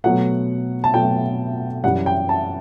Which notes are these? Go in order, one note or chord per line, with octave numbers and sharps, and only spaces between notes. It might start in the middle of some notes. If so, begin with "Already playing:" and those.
B2 F#3 A3 F#5
A5
B2 F#3 A3 G5
F#2 E3 G3 F#5
G5
A5